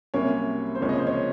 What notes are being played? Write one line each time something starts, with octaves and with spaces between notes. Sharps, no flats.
C2 C3 F#3 A#3 C#4 C#5
C5
C#2 C3 F3 A#3 C#5
D#5
C5
C#5